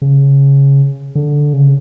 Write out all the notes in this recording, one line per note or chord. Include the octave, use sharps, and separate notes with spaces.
C#3
D3
C#3